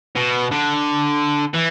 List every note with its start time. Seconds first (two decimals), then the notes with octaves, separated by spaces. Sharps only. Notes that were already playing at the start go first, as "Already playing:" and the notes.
0.16 B2
0.51 D3
1.54 E3